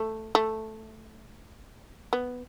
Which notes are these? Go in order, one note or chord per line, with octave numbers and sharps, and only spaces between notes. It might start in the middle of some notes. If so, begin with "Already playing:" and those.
Already playing: A3
A3
B3